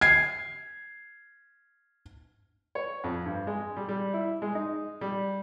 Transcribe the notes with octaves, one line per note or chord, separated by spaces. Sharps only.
G#6 C7
C#5
F2
G2
G#3
G3
G3
E4
G#3
D#4
G3